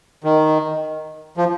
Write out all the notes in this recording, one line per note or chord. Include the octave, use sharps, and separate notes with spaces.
D#3
F3